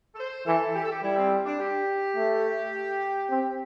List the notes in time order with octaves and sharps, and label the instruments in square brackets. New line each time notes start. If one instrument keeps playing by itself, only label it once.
[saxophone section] A4
C5
[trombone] E3 [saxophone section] A4
[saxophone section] G4
A4
G4
[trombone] G3 [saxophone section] E4
[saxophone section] C4
D4
G4
[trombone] A3
C4